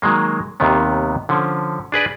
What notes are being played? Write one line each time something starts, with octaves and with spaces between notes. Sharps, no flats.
D#3 F#3 G#3 A#3
D#2 C3 D#3 G3 B3
D3 F3 C#4
D4 G#4 B4 D5